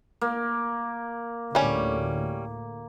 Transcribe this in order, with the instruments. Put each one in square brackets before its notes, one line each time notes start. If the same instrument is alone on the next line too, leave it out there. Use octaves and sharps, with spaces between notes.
[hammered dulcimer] A#3
[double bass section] D2 A2 [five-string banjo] G3 C#4